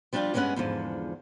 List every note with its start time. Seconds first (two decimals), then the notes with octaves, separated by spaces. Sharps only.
0.13 F3 G3 D4 D#4 F4 G4
0.34 G2 F3 G#3 B3 C#4 F#5
0.56 E2 G#2 D3 F3